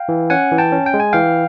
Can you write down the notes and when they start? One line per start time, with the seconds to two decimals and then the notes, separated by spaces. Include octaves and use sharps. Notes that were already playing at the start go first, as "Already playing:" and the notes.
Already playing: F5 G5
0.09 E3
0.30 C#4 F#5 G#5
0.52 E3
0.58 G5 A5
0.72 C#4
0.86 G5
0.94 G#3
1.00 G#5
1.13 E3 F5 G5